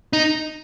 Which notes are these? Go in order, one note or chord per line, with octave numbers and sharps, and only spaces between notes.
D#4